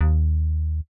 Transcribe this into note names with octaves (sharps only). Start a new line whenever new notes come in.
D#2